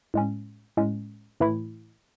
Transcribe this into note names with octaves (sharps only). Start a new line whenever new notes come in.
A2 G#3 C#4
A2 G#3 C#4
A2 E3 A3 E4